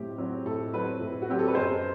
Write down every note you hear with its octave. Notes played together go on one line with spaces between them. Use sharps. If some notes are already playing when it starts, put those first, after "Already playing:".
Already playing: A2 F#3 C4 G4
F#3 C4
A2 A4
F#3 C4 B4
A2
F#4
F#3 C4 G4
A4
B4
F#2 C5